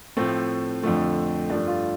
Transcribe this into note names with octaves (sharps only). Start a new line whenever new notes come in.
A2 F3 A3 C4
F2 D3 F3 A3
G2 F3 A3 D4
F4